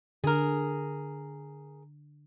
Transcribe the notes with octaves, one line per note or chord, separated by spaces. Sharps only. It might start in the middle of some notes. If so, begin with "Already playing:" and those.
D3 G#4 A#4